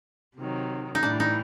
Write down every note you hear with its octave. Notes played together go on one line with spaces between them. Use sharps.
C3 D#3 F#3
D#4
A2 E3 G3 D4
D#4